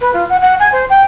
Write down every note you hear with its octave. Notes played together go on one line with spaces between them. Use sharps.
B4
F4
F#5
F#5
G#5
C5
G5